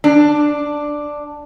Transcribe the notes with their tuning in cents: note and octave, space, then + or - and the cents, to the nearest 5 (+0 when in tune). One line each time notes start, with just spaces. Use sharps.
D4 +5